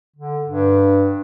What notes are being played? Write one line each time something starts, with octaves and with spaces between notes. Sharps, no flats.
D3
G2